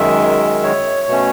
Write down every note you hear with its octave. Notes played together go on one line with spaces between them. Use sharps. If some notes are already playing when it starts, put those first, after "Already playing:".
Already playing: F#2 D#3 G#3 E5
C#5
B2 A3 C#4